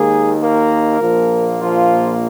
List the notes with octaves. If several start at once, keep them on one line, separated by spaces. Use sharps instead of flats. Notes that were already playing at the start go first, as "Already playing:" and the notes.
Already playing: D#2 D#3 G#3 A#3 G#4
A#3 A#4
A#1 A#2 F3 A#3
F3 F4